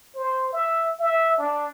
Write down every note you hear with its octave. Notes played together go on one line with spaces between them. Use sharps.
C5
E5
E5
D4